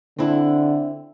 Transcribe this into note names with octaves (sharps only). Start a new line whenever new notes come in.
D3 C4 D4 E4